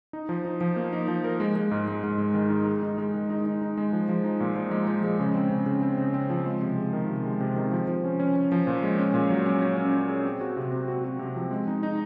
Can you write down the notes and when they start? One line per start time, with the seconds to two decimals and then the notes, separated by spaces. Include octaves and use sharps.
0.13 D#4
0.29 F3
0.45 D#4
0.61 F3
0.76 A#3
0.93 D#4
1.08 F3
1.24 A#4
1.40 G#3
1.56 G#3
1.71 G#2
1.88 G#3
2.04 G#2
2.18 G#3
2.34 D#3
2.50 D#4
2.66 G#3
2.83 D#4
2.98 G#3
3.14 D#3
3.30 D#4
3.46 D#4
3.62 D#4
3.77 G#3
3.93 F3
4.09 F3
4.24 D#4
4.40 A#2
4.56 F3
4.71 G#3
4.87 F3
5.03 G#3
5.20 C#3
5.35 C4
5.51 C#3
5.66 C#3
5.82 C4
5.98 C#3
6.14 C4
6.30 F3
6.46 G#3
6.62 C3
6.77 G#3
6.93 D#3
7.09 C3
7.24 G#3
7.40 C3
7.56 D#3
7.71 F3
7.88 F3
8.04 C#4
8.20 C#4
8.36 C#4
8.52 F3
8.67 A#2
8.83 G#3
8.99 C#4
9.14 A#2
9.30 F#3
9.46 C#4
9.61 C#4
9.77 C#4
9.93 C#4
10.09 G#4
10.25 C4
10.41 F#4
10.57 C3
10.72 C4
10.88 F#4
11.04 F#4
11.19 C3
11.36 F3
11.51 G#3
11.68 D#4
11.83 D#4